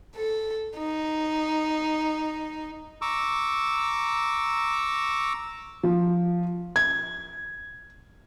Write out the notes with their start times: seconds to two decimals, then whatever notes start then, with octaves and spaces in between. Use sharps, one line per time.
0.15 A4
0.77 D#4
3.02 A#5 C#6 D6 E6
5.83 F3
6.76 G#6